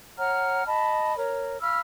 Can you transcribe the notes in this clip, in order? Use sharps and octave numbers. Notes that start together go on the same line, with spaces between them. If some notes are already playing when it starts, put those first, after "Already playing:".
C#5 F#5 A#5 F6
D#5 A5 B5
A#4 C#5
F5 B5 E6 F6